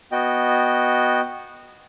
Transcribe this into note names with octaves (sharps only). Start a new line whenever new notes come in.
B3 F#4 D#5 G5